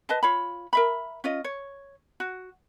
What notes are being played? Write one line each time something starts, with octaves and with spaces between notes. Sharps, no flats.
B4 D#5 A5
F4 C#5 B5
A#4 E5 B5
C#4 F4 D#5
C#5
F#4